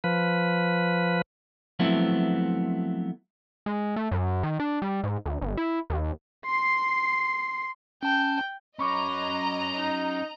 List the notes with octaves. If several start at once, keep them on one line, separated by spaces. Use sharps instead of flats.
F3 B4
F3 F#3 A3 B3 C4 E4
G#3
A3
F#2
D#3
D4
G3
G#2
D2
G1
E4
D#2
C6 C7
C#4 G5 A5
F#3 C#4 D#5 A#5 B5 C#6 D6
D#4